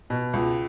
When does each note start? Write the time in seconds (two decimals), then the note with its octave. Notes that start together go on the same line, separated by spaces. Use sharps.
0.10 B2
0.33 C#2